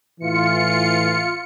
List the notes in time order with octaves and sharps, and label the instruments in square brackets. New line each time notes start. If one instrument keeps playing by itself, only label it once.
[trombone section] A2 E3 [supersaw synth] F4 C#7